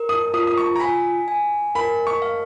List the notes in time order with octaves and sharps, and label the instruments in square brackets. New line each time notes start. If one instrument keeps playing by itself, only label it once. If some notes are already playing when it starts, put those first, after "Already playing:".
Already playing: [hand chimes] A#4
[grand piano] D#6
[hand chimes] F4 [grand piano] D#6
[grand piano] D#6
C#6
A#5
[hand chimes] G#5 [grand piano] B5
[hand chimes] G#5
[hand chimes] A#4 [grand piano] B5
[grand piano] C#6
[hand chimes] F5